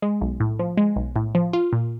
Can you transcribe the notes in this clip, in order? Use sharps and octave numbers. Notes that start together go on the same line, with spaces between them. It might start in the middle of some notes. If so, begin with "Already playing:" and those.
G#3
B1
A2
F3
G#3
B1
A2
F3
F4
A#2